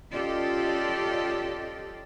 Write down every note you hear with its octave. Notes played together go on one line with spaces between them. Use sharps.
C#4 F4 G4 A4 D5 D#5